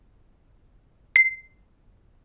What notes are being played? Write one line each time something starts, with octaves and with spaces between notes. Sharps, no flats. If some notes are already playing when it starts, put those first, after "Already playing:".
C7